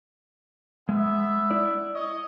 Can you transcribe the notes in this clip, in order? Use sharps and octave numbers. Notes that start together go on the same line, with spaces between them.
G#3 B3 E5
E4 D5
C#5 D#5